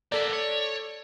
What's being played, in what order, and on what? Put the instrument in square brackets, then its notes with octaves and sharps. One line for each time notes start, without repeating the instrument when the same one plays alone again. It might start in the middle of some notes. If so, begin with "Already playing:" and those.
[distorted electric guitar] A#3 B3 [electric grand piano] A4 D5
[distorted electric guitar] C#5